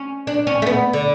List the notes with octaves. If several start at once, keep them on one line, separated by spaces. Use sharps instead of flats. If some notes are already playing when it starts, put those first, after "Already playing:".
Already playing: C#4
D4
C#4
A3
B3
D3